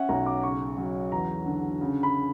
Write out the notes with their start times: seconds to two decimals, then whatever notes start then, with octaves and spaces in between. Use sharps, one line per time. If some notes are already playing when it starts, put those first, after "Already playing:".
Already playing: C#4 E5 F#5
0.09 B1 A#5
0.26 D6
0.43 C#3 C#6
0.78 F#3
1.12 E2 A#5
1.46 D3
1.81 C#3
2.03 B5